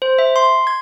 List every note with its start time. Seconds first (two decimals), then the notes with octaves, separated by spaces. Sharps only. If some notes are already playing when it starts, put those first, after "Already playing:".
0.02 C5
0.18 E5
0.36 C6
0.67 G#6